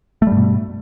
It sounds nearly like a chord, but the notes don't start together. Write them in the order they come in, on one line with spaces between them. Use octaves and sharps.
A3 G3 G2 B2